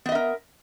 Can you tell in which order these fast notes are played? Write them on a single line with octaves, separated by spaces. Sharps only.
B3 D#5 E5 A#4